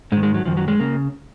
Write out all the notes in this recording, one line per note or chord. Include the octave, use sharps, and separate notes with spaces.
G#2 D#3 G#3
G#3
F#3
F#2 D#3 F3
F#3
G#3
C#3 A#3